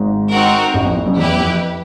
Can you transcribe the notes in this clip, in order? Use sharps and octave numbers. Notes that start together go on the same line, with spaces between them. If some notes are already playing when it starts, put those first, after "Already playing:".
Already playing: G#1 G#2
C4 D#4 F#4 A#4
A1 A2
F2
F2
F#1 F#2
E2 E4 G4 B4
F2